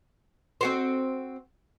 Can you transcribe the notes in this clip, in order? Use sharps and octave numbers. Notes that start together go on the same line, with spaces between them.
C4 F#4 C5